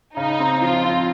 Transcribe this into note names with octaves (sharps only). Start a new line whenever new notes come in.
C#3 D#4
C4
F3 F4
C4